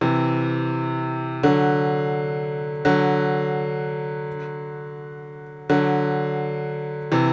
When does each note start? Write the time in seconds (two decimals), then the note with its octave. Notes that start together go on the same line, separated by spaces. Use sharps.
0.01 C3 E3
1.43 D3 F#3
2.85 D3 F#3
5.70 D3 F#3
7.12 C3 E3